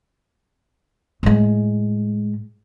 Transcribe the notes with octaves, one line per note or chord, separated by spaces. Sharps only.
A2 G#3